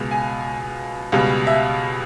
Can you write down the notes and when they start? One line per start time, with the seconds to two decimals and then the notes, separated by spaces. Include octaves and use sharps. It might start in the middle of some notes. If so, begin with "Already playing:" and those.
Already playing: C#2 B2 G#3
0.11 G#5
1.12 C#2 B2 G3
1.47 E5